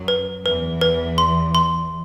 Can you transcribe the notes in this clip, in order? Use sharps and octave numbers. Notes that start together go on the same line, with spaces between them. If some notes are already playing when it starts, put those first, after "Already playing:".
Already playing: F#2 F#3
B4
E2 E3 B4
B4
C6
C6